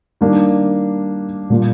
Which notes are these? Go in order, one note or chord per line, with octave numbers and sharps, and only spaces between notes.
D#3 G3 A#3 D4
A#2 G3 A#3 F4